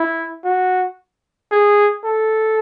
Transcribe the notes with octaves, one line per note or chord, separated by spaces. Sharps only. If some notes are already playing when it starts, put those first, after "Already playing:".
Already playing: E4
F#4
G#4
A4